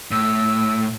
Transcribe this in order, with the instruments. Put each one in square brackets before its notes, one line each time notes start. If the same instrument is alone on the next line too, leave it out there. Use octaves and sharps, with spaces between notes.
[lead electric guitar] A2 [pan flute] E6